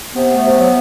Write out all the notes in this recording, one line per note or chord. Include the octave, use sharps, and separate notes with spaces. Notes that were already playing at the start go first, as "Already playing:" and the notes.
C3 B3
A3
C3
F#3